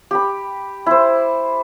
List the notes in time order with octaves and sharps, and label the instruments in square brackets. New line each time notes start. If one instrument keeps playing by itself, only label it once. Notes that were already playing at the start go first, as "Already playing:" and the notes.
[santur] G4 B5
E4 C5